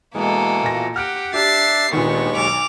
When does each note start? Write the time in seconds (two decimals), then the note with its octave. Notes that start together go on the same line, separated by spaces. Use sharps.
0.15 B2 E3 G#3 A#3 A4
0.63 A#2 F4 A#6
0.96 G4 F#5 F6 F#6 D7
1.34 D4 G4 E5 A6 C7
1.93 D#2 A#2 D#3 G#3 B3 D4 C#6
2.37 B1 D6 F7